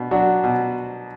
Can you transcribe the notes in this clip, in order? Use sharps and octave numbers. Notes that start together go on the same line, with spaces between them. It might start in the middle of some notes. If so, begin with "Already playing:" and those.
Already playing: B2 D4
F#3 D4 F#4
B2